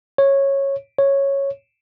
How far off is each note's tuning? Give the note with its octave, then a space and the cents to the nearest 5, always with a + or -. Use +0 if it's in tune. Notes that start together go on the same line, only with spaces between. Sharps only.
C#5 -10
C#5 -5